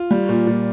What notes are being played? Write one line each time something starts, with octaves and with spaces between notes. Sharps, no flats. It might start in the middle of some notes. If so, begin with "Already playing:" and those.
Already playing: F4
G3
A#2
A#2